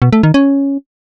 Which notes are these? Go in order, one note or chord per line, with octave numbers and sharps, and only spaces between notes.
B2
A3
D#3
C#4